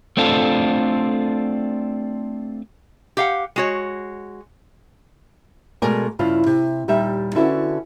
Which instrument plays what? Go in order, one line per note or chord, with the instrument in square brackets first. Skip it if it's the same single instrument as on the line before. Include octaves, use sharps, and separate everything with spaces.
[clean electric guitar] A3 C4 D4 F4 A4
[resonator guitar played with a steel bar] G4 F5 F#5
G#3 F#4 C#5
[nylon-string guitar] B2 G#3 A3 A#4 D5 G#5
G2 C#3 E4 F4 F5
C3
D#2 A#2 G3 D#4 E5
D3 C#4 E4 F#4 A4 B4